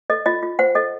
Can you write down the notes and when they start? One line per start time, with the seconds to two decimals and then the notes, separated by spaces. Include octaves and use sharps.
0.10 A4 D#5
0.26 F4 D#5
0.43 F4
0.59 C5 F#5
0.75 A4 D#5